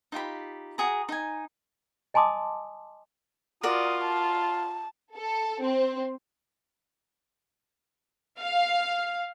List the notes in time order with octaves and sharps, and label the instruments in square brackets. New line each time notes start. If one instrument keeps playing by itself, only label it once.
[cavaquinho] D#4 F4 G4 B5
F#4 G#4 A#5
D#4 G#5
[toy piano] D#5 G#5 A5 C6 D6 D#6
[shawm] F4 [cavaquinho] F#4 A#4 D5 [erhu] D#6
[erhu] A5
[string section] A4
C4
[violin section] F5